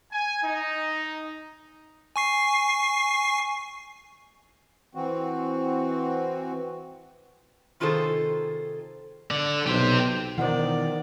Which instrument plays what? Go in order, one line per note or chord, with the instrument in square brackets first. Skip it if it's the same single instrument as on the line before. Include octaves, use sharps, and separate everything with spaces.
[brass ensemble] G#5
D#4
[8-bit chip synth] G#5 C#6 C7
[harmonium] E3 C4 F#4
[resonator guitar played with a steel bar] C3 D#3 F4 G#4 A4 C5
[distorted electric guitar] D3 D5
[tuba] B1 [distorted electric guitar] G4 C5
[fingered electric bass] B2 E3 [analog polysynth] D#3 [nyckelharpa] A#4 D5 [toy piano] C5 F#5